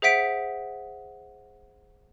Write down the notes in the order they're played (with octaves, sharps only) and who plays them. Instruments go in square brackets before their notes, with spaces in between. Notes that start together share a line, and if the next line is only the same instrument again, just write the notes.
[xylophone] G#4 C5 E5 F#5 B6 D7